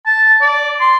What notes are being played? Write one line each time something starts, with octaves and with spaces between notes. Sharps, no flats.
A5
D5
C6